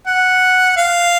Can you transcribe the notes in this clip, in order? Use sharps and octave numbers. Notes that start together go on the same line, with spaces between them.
F#5
F5